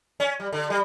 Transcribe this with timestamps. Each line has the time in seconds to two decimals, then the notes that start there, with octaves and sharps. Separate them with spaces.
0.20 C#4
0.40 G3
0.53 D3
0.70 G3